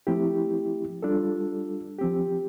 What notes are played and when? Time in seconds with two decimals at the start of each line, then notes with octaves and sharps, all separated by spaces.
0.07 F3 A3 C4 E4 G4
1.03 G3 D4 F4 A4
1.99 F3 C4 G4